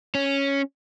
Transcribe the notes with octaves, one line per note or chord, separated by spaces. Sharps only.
C#4